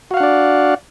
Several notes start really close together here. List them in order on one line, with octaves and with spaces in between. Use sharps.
F#4 F5 F#5 D4 D5